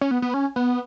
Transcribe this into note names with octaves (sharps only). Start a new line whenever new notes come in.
C#4
B3
B3
C#4
B3